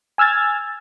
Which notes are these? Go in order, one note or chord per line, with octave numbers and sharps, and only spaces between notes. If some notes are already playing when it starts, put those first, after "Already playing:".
G#5 E6 F6 G#6 A6